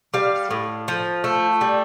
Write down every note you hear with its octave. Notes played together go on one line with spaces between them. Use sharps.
G3 F5
A2
F3
A3
G3